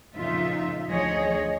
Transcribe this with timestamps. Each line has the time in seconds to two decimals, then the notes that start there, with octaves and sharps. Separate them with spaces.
0.16 F2 A#2 C#3 D#4 F4 E5
0.90 D2 F3 G#4 C#5 D#5